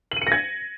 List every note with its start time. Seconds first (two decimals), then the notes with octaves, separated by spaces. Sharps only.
0.11 F#7
0.17 D#7
0.22 C#7
0.27 A#6
0.32 G#6